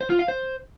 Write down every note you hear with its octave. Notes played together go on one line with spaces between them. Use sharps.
C5
F4
F5
C5